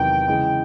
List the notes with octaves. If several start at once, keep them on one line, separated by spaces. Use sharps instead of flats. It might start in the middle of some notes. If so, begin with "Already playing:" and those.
Already playing: E2 C3 D#3 F#3 B3 G5
C#3 E3 G#3